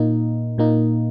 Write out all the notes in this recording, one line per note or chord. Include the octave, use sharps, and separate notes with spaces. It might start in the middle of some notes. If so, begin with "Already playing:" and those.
Already playing: A#2 A#3 D#4
A#2 A#3 D#4